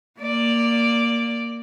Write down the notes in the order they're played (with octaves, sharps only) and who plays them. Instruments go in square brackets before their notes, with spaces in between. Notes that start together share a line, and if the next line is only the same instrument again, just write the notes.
[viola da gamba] A#3 D5